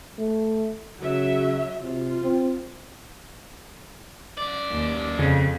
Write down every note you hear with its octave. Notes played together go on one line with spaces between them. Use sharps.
A3
C#3 F#3 E5
C3 F4
C4
F#2 D5
D#2
F2 C#3